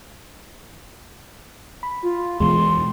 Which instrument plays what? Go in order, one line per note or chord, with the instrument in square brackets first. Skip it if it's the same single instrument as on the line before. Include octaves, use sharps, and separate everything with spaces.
[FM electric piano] B5
[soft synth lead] F4
[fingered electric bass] E2 B2 E3 [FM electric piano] G#3 [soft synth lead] C6